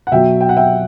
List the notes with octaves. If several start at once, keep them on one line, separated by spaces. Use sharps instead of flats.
F#5
B2 F#3 E5 G5
G5
F#5
E5 G5